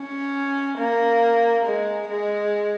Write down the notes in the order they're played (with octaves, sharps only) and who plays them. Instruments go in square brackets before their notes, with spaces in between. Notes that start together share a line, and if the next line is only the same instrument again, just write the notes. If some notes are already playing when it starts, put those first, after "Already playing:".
Already playing: [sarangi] C#4
A#3
G#3
G#3